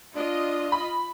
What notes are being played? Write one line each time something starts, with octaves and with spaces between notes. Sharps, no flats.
D4 F4 D#5
B5